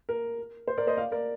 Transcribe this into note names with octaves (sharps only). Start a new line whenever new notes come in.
A#4
C5
A#4 D5
C5 D#5
D5 F5
A#4 D5